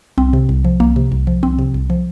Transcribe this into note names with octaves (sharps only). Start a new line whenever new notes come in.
C2 C4
C3
C2
F3
C2 A#3
C3
C2
F3
C2 C4
C3
C2
F3